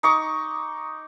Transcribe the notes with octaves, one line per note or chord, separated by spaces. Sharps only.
D#4 C#6 D6